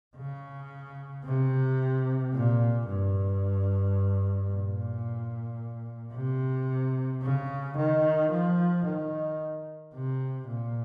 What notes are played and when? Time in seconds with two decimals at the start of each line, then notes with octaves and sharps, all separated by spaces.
0.17 C#3
1.25 C3
2.33 A#2
2.88 G2
4.50 A#2
6.13 C3
7.22 C#3
7.77 D#3
8.31 F3
8.85 D#3
9.94 C3
10.48 A#2